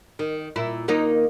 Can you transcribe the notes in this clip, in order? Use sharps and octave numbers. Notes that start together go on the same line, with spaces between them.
D#3
A#2 E4
D#2 A#3 D#4